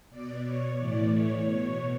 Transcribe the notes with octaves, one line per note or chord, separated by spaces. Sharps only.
B2 D5
C#5
A2 E3 D5
C#5
B2